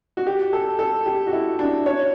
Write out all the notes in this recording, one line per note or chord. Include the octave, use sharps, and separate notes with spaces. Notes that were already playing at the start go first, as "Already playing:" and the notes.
F#4
G4
A4
A4
G4
F#4
E4
D4
C#5